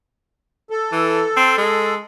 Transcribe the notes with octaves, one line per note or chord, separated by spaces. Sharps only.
A4
E3
C4
G#3